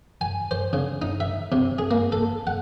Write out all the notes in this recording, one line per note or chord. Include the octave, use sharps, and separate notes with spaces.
G#5
C5
C#3
D#4
E5
C3
G#4
A#3
A4
F#5